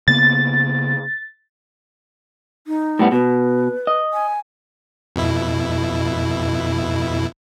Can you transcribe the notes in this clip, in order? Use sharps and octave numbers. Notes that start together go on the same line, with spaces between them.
C#3 A#3 B3 A6
D#4
A2 G3 B3
B2 B4
D#5
G#5
F2 B2 E4